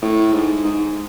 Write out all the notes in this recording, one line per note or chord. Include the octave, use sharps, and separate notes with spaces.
A2
G#2
G#2